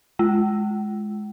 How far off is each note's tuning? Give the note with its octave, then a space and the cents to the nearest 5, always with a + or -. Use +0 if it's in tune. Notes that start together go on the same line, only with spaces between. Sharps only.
G#3 +15